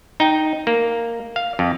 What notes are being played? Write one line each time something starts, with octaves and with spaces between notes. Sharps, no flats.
D#4 G5
A#3
F5
F2